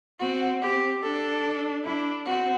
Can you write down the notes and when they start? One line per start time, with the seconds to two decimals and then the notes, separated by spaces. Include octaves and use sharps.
0.19 C4 F#4
0.61 C4 G4
1.02 D4 A4
1.84 D4 E4
2.26 C4 F#4